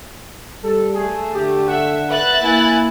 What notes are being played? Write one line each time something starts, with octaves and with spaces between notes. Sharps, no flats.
G3 A4
A3 G#4
D3 G4
E5 F#5
B4 E5 F#6 A6
A#3 E4 G#5